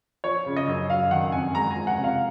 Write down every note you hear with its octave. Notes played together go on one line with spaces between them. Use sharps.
F3 C#5
C#3
D#5
F#2
F#3 F5
D#3 F#5
F2 G#5
G#3 A#5
G#5
F3
F#5
C3
F5